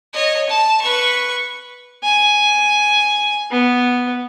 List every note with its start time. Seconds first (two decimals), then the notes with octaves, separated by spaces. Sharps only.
0.13 C#5 D#5
0.50 A5
0.82 B4 C#6
2.03 G#5
3.51 B3